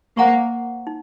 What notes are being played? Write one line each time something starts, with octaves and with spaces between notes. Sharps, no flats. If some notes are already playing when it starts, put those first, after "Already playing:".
A#3 C5 F#5 A#5 C#6
D#4